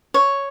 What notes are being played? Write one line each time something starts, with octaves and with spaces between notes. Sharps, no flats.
C#5